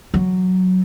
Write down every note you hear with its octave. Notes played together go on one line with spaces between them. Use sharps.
F#3